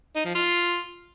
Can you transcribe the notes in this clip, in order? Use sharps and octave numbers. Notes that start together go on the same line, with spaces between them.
D#4
F3
F4